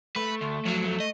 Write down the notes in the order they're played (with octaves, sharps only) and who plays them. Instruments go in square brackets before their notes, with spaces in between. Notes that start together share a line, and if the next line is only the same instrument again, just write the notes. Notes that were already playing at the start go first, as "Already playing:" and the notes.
[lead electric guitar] A3 [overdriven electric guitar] B4
[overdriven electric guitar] D2
F2 F#3
[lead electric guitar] A3
[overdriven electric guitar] D#5